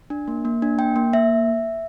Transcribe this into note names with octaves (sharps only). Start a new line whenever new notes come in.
D4
A#3
A#3
D4
A#3 G5
A#3
A#3 E5